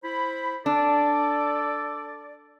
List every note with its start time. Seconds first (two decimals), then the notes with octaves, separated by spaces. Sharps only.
0.04 E4 C5 B5
0.66 D4 A4 D5